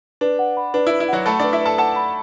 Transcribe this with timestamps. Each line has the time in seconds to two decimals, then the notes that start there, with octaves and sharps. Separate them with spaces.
0.21 D4 B4
0.39 F#5
0.57 B5
0.74 D4 B4
0.87 E4 B4
1.00 E4
1.09 F#3 F#4 F#5
1.26 A3 A4 B5
1.40 D4 B4 D5
1.53 E4 E5
1.61 A4 B4 A5
1.78 A4 F#5 A5
1.96 B5